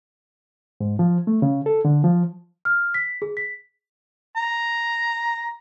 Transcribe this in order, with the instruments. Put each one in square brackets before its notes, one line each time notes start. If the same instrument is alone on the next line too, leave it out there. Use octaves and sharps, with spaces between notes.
[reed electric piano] G#2
F3
A3
C#3
A4
D3
F3
[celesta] F6
B6
G#4
B6
[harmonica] A#5